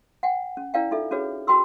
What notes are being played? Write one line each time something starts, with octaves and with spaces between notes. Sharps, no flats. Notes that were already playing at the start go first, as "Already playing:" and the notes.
F#5 G5
C#4
C#4 E4 A#4 D5 F5 G5
D#4 F4 A4 E5
C#4 D4 F#4 G#4 B4 C#5
F#4 A#4 G5 B5 C6 E6